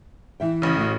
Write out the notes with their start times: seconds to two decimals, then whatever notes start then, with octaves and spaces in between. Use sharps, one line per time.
0.40 E3 E5 G5
0.62 A1 C#3
0.76 A2 F#4